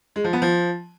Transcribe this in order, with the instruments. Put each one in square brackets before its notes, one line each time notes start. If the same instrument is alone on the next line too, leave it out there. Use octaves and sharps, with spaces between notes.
[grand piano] G#3
F3
B3
F3